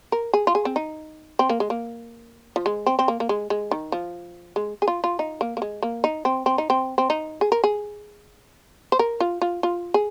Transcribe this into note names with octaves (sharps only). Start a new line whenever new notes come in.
A#4
G#4
F4
G#4
C4
D#4
C4
A#3
G#3
A#3
F3
G#3
C4
C4
A#3
A#3
G#3
G#3
D#3
F3
G#3
G#4
F4
F4
D#4
A#3
A#3
G#3
A#3
D#4
C4
C4
D#4
C4
C4
D#4
G#4
A#4
G#4
C5
A#4
F4
F4
F4
G#4